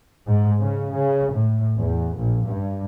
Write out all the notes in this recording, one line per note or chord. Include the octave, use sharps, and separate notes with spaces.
G#2
C#3
C#3
A2
E2
A#1
G2